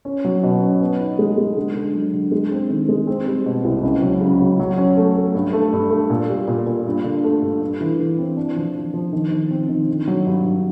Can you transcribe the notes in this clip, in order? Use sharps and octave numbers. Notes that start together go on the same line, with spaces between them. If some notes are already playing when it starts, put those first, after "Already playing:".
C#4
F#3
B2
C#4
B3
D#4
G#3
G#3
D3
D3
F#3
D3
G#3
C4
D#3
G#3
C4
G3
B2
C2
C#2
F#3
C#3
F#3
F#3
C#4
A3
A3
G2
A3
G2
A3
A#2
G3
A#2
A#2
G2
D3
A3
G2
G2
E3
E3
C4
D4
F3
F3
F3
D#3
D#3
C4
D#3
D3
F#3
G2
G2